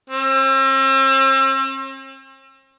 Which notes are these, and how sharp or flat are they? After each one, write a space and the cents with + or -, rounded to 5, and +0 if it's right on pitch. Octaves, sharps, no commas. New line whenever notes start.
C4 +45